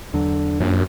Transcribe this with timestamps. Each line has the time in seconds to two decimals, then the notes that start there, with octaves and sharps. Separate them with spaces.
0.14 E2 D3 F#3
0.60 A#1 F#2